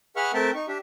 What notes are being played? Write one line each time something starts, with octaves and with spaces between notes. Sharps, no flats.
G#4 B4 E5 F#5 C#6 F6
A3 C4 A#4 E5 G5 A5
D#4 C#6
D4 G4 E5